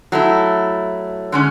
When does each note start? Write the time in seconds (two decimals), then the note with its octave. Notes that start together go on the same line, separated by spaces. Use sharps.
0.12 F#3 A3 E4
1.32 D3 G#3 C#4